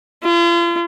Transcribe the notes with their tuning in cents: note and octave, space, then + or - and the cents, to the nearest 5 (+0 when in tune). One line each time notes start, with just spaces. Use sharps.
F4 -40